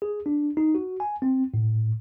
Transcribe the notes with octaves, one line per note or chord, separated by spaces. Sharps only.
G#4
D4
D#4
F#4
G#5
C4
A2